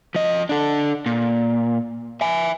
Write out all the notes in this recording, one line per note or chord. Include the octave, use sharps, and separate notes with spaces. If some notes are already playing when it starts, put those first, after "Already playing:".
F3 D#5
D4 A4
A#2
E5 G#5